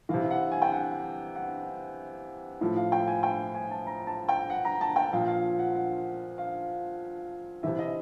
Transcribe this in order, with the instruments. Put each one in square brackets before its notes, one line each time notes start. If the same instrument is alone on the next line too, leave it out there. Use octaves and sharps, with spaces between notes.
[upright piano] C3 E3 F5
F#5
G#5
G5
F#5
F#5
A2 F3
F5
G5
G#5
G5
G#5
A5
A#5
A5
G5
F#5
A#5
A5
G5
A#2 F3 F5
F5
F#5
F#5
F5
C3 E3 E5
D#5